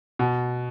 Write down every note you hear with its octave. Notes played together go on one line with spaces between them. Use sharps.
B2